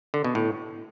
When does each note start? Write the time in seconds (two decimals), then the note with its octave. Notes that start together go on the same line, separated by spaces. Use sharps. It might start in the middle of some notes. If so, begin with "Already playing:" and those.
0.14 D3
0.24 B2
0.35 A2